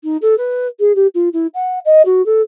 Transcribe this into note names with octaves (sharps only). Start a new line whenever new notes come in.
D#4
A4
B4
G#4
G4
F4
E4
F#5
D#5
F#4
A4